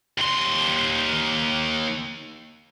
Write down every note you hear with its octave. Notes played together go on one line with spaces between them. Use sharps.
D#2 C6